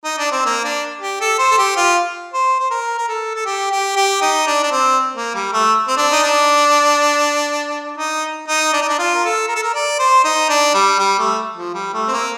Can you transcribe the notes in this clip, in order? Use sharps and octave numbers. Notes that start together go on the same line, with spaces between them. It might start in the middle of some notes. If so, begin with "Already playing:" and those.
D#4
D4
C4
A#3
D4
G4
A4
C5
A4
G4
F4
C5
C5
A#4
A#4
A4
A4
G4
G4
G4
D#4
D4
D4
C4
A#3
G3
A3
C4
D4
D#4
D4
D#4
D#4
D4
D#4
D4
F4
A#4
A4
A#4
A4
A#4
D5
C5
D#4
D4
G3
G3
A3
F3
G3
A3
C4
A#3